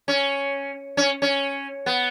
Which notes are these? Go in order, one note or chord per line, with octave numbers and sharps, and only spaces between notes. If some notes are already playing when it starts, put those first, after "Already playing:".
C#4
C#4
C#4
B3